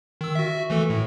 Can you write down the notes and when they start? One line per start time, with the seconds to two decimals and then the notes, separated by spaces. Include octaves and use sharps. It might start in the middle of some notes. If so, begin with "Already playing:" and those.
0.21 D#3 E6
0.35 F#4 E5
0.70 E3 A3 A4
0.90 A2